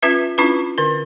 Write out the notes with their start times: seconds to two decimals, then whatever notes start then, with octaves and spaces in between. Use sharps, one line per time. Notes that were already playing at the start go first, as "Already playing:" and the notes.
0.02 C#4 F4 B4 E5
0.38 C#4 D4 E4 F4 B4
0.78 D3 A#4